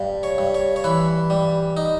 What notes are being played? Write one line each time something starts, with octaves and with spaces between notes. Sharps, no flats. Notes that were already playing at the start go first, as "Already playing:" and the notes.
Already playing: G2
C#5
G2
C#5
C#5
E3 B4
G3
D#4